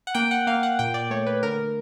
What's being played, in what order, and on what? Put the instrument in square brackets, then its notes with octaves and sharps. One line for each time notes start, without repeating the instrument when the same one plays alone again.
[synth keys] F#5
A#3 G5
F#5
A#3 F5
F#5
A#2 G5
D5
A3 C#5
B4
D3 A#4